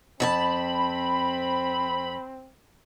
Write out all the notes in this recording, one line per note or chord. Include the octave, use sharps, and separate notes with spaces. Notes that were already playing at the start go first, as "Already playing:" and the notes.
F2 C4 F#4 A5 B5